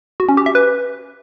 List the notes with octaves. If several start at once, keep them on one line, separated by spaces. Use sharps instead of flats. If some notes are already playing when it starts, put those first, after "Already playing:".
F#4
C#4
G4
E5
B4